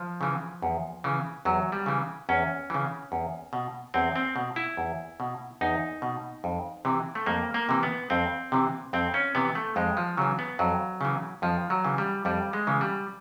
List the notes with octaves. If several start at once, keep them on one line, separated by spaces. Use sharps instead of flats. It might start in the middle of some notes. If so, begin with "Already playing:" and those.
Already playing: F3
C#3 E3
E2
C#3 E3
E2 F#3
G3
C#3 E3
E2 C#4
C#3 E3
E2
B2
E2 C4
C4
B2
E4
E2
B2
E2 D#4
B2
F2
C3 E3
A3
F2 A#3
A#3
C3 E3
B3
F2 C4
C3 E3
F2 C4
C#4
C3 E3 B3
A3
F2 G#3
F3
C#3 E3 F#3
B3
F2 F#3
C#3 E3
F2 F3
F#3
C#3 E3
G3
F2 G3
G#3
C#3 E3
G3